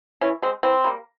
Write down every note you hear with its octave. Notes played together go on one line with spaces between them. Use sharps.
E3 C#4
G#3 C4
E3 C4
G3 A#3